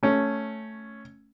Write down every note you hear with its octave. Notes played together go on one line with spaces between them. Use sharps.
A3 C#4